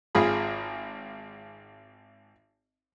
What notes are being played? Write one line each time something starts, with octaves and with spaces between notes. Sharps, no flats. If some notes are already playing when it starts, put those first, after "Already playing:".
G#1 F4 G#4 B5